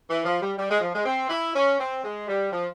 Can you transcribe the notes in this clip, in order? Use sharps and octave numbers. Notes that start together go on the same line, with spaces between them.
E3
F3
G3
G3
G#3
F3
G#3
C4
E4
C#4
C4
G#3
G3
F3